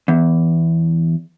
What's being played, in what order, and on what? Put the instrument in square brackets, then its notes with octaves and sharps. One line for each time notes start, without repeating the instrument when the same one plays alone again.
[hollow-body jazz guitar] E2